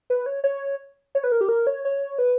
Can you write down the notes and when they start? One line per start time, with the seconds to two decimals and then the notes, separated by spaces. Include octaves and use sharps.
0.10 B4
0.26 C#5
0.44 C#5
1.15 C#5
1.24 B4
1.32 A#4
1.41 G4
1.49 A#4
1.67 C#5
1.85 C#5
2.19 B4